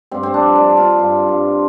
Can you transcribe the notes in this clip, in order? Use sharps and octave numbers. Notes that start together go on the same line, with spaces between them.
G2 C4
C4
D4
F3
D4
F3
F4
G2
G2